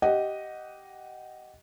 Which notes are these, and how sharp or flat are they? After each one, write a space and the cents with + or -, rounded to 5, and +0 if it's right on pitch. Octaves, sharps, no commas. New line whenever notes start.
G4 -15 D#5 +0 F#5 +0